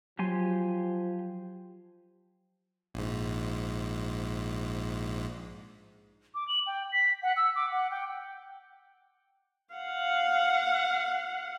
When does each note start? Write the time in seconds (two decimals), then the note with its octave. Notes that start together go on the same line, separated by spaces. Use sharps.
0.19 F3 F#3 G4 G#5 C6
2.94 A#1 G#2
6.35 D6
6.48 F#7
6.67 G5
6.92 B6
7.23 F#5
7.37 E6
7.55 D6
7.72 F#5
7.91 G5
9.74 F5 F#5